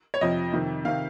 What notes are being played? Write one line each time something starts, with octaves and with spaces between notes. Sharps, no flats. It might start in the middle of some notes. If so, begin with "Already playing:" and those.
C#5
F2 C3 F3 D#5
F2 C3 D#3
C3 D#3 F5